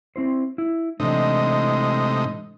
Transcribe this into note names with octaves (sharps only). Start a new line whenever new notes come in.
C4 E4 C5
E4
A2 C3 E3 G#3 D4 D#4